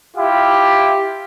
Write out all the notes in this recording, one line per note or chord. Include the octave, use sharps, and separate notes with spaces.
E4 F4 G4